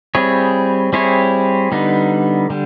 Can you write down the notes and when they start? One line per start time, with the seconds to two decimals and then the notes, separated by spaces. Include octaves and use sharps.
0.15 G3 C4 E4 G#4 C#5
0.93 G3 C4 E4 G#4 C#5
1.72 D3 G3 B3 D#4
2.50 D3 G3